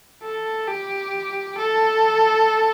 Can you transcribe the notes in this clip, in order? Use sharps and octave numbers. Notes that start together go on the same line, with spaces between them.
A4
G4
A4